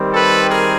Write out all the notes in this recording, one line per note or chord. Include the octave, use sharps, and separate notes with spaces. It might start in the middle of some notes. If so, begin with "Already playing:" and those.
Already playing: D#3 G3 C4
A4 B4
G#4 A#4